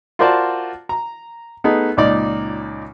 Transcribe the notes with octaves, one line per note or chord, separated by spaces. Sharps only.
F4 F#4 A#4 C5 D5 A5
A#5
A3 B3 D#4 G#4
C#2 A#2 D#4 D5